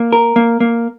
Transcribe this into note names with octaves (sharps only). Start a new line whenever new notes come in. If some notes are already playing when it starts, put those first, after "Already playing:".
Already playing: A#3
A#4
A#3
A#3